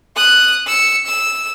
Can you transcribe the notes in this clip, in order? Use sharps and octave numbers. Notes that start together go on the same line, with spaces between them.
D#6 F#6
E6 C#7
E6